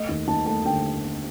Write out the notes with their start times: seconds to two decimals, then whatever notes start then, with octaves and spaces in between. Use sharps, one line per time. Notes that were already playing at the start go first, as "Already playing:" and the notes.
Already playing: A3 D#5
0.09 D#2
0.27 D#2 A5
0.46 A3 A5
0.65 D3 G5